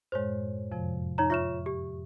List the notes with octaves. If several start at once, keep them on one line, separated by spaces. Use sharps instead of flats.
F#2 A2 G#3 C5 C#5
F2 C3 F3
D#4 C#5 A#5
F4 C#5 E5 C#6 F6 E7
G4